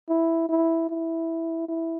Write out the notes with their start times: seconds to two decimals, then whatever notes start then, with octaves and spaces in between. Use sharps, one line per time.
0.09 E4
0.49 E4
0.89 E4
1.69 E4